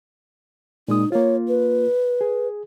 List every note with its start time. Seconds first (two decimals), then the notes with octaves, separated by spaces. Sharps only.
0.88 A#2 G#3 D#4 D#6
1.12 A#3 F4 C#5
1.48 B4
2.21 G#4